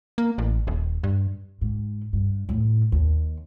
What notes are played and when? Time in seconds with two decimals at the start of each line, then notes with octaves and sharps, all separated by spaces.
0.18 A#3
0.38 A1
0.67 D#1
1.04 G2
1.61 G#2
2.13 G2
2.49 E2 A2
2.92 D#2